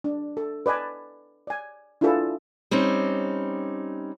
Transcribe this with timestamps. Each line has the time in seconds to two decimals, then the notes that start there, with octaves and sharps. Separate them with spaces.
0.04 D4
0.37 A4
0.66 B4 D5 D#5 G#5 A5
1.47 D5 G#5
2.01 D4 E4 F4 G#4 A4 B4
2.71 G3 C4 C#4 D#4